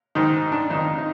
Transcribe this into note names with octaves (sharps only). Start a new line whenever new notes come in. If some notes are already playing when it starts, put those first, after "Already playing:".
G#2 D#3 D#4
D4
F2 D#3 D#4
D#4